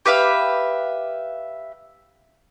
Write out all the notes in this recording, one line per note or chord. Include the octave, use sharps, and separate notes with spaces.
G4 B4 E5 F5